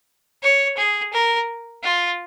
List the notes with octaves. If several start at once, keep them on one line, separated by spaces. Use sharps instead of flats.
C#5
G#4
A#4
F4